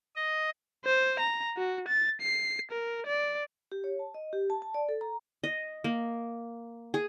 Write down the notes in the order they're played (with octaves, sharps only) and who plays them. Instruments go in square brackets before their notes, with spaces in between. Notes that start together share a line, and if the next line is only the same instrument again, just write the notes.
[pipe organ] D#5
[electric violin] C5
A#5
F#4
A6
C7
A#4
D5
[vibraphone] G4
C#5
A5
D#5
G4
A5
A5
D5
A4
A#5
[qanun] D#5
A#3
G#4